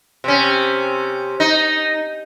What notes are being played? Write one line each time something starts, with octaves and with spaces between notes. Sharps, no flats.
C3 C#4
D#4